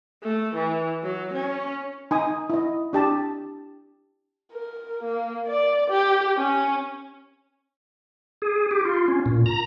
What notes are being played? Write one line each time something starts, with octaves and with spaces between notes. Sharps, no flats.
A3
E3
F#3
C#4
D#4 G#5 D#6
E4 D#5
D4 G4 A5
A#4
A#3
D5
G4
C#4
G#4
G4
F4
C#4
A#2
A#5